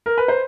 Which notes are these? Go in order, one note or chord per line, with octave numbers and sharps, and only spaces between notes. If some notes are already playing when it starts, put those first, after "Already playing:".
A#4
B4
C5